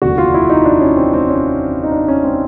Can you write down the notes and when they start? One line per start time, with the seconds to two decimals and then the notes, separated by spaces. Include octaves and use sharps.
0.02 F1 D#2 D3 F#4
0.18 F4
0.34 E4
0.49 D#4
0.65 D4
0.81 C#4
0.97 C4
1.13 C4
1.29 C#4
1.84 D#4
1.92 D4
2.08 C#4
2.24 C4